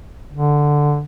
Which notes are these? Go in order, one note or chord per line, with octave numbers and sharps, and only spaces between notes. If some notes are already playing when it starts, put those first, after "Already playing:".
D3